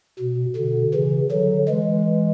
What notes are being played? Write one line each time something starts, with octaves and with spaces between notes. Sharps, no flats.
B2
B2 D3
C#3 E3
D3 F#3
E3 G#3